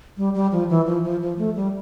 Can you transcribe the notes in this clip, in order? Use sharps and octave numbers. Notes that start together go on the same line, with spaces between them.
G3
G3
F3
E3
F3
F3
F3
A3
G3